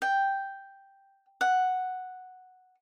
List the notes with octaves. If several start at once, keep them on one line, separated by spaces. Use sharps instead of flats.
G5
F#5